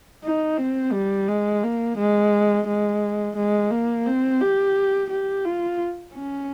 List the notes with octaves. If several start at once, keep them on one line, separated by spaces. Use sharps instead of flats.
D#4
C4
G3
G#3
A#3
G#3
G#3
G#3
A#3
C4
G4
G4
F4
C#4